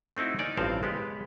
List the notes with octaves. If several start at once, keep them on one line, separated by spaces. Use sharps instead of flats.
A3 C4 D#4 E4 F#4
A#3 D#4 C#5 D5 G#5
A1 G2 F3 C4 C5 F5
G#3 B3 G4